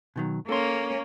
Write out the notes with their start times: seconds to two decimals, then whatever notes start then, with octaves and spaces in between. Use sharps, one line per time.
0.16 B2 D#3 F#3
0.49 A#3 C#4 A4 C6